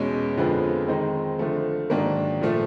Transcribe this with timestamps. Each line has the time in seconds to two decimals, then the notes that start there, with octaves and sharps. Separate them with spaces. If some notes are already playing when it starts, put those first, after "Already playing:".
Already playing: E2 B2 G#3 C#4
0.37 F2 D3 F3 G#3 B3
0.88 D#3 G#3 C4 D#4
1.39 D3 F3 A3
1.90 G#2 D#3 F#3 A#3 D4
2.41 A#2 F3 A3